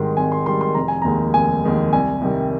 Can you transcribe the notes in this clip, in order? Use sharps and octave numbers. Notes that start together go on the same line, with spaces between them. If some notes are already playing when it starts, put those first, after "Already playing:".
Already playing: G#1 G#2 D#3 G3 C6
G#1 G#5
C6
G#2 D#3 G3 C6
C6
F1 A#5
G#5
D#2 D#3 G#3 A#5
F1 G#5
D#2 D#3 G#3
C2 G#5
C3 D#3 G3